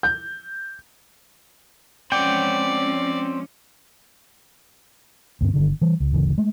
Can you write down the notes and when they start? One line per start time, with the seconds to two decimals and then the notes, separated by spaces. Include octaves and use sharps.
0.03 G6
2.12 F3 G#3 C4 C#4 D5 F#5 G5
5.41 D2 G2 C4
5.54 G1 D3 D#3
5.81 E3 G3
6.00 C#2
6.12 G1 D2 C#3 E3
6.38 G#3 A3